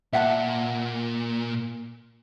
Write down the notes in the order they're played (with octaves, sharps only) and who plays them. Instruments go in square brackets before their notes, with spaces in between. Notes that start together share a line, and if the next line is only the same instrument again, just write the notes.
[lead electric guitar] A#2 [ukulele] E5 F#5 A5